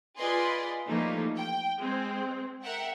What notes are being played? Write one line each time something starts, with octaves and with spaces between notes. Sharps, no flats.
F4 G#4 B4 D5 D#5 C6
E3 F3 G3 A3 A#3 D#4
G5
G#3 C4
A#4 E5 F#5 G5